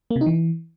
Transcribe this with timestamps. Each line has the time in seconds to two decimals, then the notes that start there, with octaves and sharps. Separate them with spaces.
0.11 A#3
0.16 C3
0.21 D#4
0.26 E3